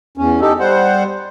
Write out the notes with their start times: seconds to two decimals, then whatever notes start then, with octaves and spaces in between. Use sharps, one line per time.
0.18 E2 C#4
0.41 D#4 G4 A4
0.60 G3 C5 F#5